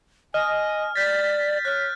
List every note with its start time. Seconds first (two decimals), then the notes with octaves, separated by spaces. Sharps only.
0.34 D#5 G#5 F6
0.96 D5 G6 A6 B6
1.65 C#5 F6 F#6